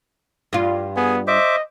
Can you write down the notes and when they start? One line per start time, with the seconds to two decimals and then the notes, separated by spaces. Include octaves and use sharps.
0.53 G2 F4
0.96 B3 G#4 G#5
1.27 C5 D#5 E5 D6